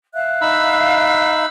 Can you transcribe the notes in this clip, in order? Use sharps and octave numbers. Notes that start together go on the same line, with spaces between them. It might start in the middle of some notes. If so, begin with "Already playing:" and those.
E5 F5 F#6
D#4 B5 E6